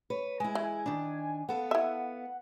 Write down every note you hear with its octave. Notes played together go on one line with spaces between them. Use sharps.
B4 C#5
G#3 E4 G#5
E3
D#3 D4
B3 A4 F5 F#5
E4 E5